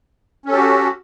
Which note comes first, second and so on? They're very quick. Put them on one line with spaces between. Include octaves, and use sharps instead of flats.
C#4 A4 G4 F#4